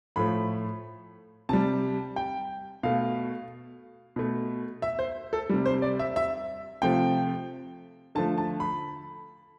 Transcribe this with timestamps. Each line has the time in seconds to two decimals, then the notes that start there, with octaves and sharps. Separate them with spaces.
0.16 A2 F3 A3 B5
1.49 C3 G3 A5
2.16 G5
2.83 B2 A3 F5
4.16 B2 A3
4.82 E5
4.99 C5
5.33 A4
5.49 C3 G3
5.66 C5
5.82 D5
5.99 E5
6.16 E5
6.82 C3 F3 A3 G5
8.15 D3 F3 A3 A5
8.38 A5
8.60 B5